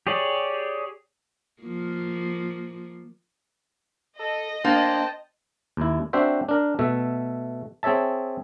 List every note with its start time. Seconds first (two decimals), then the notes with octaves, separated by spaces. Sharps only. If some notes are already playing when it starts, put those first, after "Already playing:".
0.07 G4 G#4 C#5 D5
1.63 F3 A#3
4.19 A4 D#5
4.64 A#3 D4 C5 G5 A5
5.77 D#2 E4
6.13 C4 D4 F#4 C5 E5
6.49 D4 A#4
6.79 B2 A3 E5
7.83 C4 G#4 C#5 E5 A5